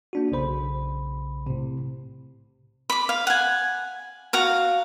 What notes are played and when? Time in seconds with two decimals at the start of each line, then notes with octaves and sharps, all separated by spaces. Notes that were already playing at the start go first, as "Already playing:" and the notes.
0.13 A#3 D4 F#4
0.32 B1 C#3 C5 B5
1.46 A2 C3
2.90 B5 D6
3.09 F5
3.27 F#5 G#5
4.33 F#4 F5 A#5